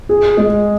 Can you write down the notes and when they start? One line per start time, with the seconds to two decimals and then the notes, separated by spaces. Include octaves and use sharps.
0.09 G#4
0.37 G#3